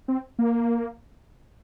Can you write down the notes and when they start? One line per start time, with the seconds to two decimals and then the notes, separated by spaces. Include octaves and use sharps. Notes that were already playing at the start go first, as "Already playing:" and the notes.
0.08 C4
0.39 A#3